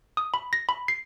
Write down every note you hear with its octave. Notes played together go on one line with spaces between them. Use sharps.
D#6
B5
A#6
B5
C7